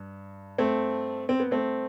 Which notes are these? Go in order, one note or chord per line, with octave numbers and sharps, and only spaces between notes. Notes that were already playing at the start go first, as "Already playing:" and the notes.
Already playing: G2
A3 C4
C4
B3
A3 C4